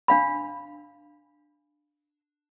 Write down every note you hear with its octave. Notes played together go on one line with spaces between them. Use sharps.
D4 F5 B5